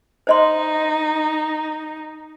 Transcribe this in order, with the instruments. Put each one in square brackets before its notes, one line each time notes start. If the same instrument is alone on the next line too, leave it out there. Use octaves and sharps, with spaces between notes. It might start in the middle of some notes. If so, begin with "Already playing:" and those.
[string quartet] D#4 [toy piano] C5 D#5 C6